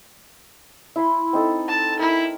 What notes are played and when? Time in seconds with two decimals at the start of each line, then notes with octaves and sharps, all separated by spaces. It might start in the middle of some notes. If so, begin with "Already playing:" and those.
0.96 E4 B5 C6
1.33 C4 D#4 A4
1.68 A5
1.99 E4 A#4